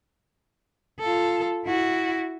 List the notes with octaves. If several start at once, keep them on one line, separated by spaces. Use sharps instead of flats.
F4 A4
E4 F#4